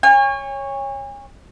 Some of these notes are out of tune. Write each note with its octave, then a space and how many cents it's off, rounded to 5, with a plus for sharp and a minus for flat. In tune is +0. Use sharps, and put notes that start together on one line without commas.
C#5 +0 G#5 -40